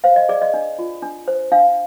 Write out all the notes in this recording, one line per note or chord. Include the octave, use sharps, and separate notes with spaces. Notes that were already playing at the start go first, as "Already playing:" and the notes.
C5 F5
D#5
G#4 D5
D#5
D4
F4
D4
C5
D4 F5